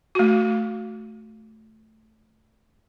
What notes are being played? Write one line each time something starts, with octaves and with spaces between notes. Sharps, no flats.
A3 F#4